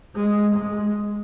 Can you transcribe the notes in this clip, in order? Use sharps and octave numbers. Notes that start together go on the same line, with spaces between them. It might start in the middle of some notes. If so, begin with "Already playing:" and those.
G#3
G#3